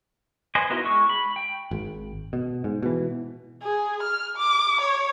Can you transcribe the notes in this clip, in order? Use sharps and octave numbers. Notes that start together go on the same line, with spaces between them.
B4 C5 D#5 G#5
B3 D#4 E4 F#4 A#4
G#3 C#6 E6
B5
G5
G#1
B2
G#2
B2 E3
G#4
F6
D6
C#5